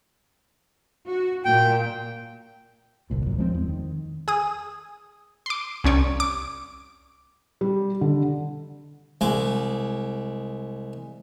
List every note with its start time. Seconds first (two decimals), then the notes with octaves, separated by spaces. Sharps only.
1.07 F#4
1.45 A#2 G5
3.10 G1 C2 A#2
3.26 D1 F#2
3.38 F3 G#3 A#3 C4
3.54 E2
3.69 D#3
4.28 G#4 D#6
5.46 C6 D6
5.84 C2 C#4 C#5 D5
6.20 D6
7.61 G3
8.01 D3
9.21 C2 G#3 D6